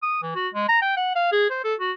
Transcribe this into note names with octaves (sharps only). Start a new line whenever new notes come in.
D#6
E3
F#4
G#3
A#5
G5
F#5
F5
G#4
C5
A4
F#4